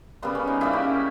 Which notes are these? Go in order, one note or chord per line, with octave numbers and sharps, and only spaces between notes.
C#3 G3 A#3 B3
C#4
D#4
C#3 G3 A#3 E4
G4